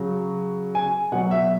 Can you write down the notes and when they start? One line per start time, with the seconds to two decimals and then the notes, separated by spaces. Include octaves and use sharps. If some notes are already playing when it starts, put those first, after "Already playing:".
Already playing: C#3 F#3
0.75 G#5
1.12 B2 F#3 F#5
1.31 E5